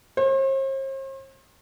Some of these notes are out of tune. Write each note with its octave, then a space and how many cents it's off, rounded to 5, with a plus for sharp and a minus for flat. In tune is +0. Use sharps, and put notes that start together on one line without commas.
C5 +45